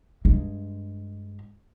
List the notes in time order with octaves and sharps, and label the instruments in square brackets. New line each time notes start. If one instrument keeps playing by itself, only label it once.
[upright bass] G2 G#3